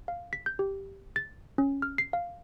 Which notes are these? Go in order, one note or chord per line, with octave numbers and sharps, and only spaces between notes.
F5
B6
G6
G4
A6
C#4
F6
C7
F5